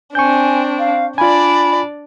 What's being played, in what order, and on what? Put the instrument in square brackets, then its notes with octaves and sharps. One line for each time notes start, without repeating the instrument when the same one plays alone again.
[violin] C4 D4 [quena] G#5 [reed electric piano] C#6 G6
[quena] F5
[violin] D4 D5 [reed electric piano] F4 G#5 [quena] B5